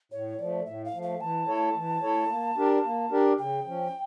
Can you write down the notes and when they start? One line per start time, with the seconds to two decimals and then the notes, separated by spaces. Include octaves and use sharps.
0.12 A2 C#5
0.39 F3 A3 D5
0.66 A2 E5
0.85 F5
0.93 F3 A3
1.03 F5
1.21 E3 A5
1.47 A3 E4 A4 C#5
1.75 E3
2.02 A3 E4 A4 C#5
2.29 A#3
2.57 D4 G4 A#4 D5
2.84 A#3
3.11 D4 G4 A#4 D5
3.38 C#3 G5
3.65 F3 C#4